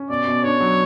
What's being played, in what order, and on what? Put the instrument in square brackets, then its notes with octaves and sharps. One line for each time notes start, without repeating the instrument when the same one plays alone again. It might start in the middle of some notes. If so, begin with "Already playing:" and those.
Already playing: [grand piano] C#4
[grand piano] B2 [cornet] D5
[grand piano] B2
[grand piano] D4 [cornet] C#5
[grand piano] F#3